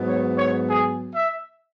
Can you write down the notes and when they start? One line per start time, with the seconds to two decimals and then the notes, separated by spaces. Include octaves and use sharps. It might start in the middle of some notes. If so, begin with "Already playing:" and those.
Already playing: G#2 F#3 B3
0.08 C#5
0.38 C#5
0.69 G#4
1.14 E5